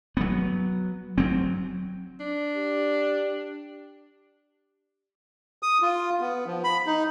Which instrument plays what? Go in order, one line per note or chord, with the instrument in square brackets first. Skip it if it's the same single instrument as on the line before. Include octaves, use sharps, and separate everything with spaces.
[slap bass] F#3 B3
F#3 C4
[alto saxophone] D4
[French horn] G4
[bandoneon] D#6
F4
B3
F3
B5
D#4